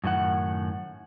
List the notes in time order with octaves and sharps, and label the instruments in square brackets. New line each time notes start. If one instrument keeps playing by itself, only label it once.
[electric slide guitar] F#2 A2 D#3 F#5